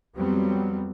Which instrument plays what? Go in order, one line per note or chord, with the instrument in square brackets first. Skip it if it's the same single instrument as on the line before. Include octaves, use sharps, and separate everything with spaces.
[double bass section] F2 F#3 G3 B3 C4